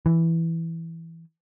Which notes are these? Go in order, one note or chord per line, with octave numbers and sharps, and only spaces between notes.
E3